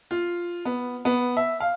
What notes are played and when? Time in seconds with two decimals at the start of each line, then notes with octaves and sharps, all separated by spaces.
0.11 F4
0.65 B3
1.05 B3
1.37 E5
1.60 F5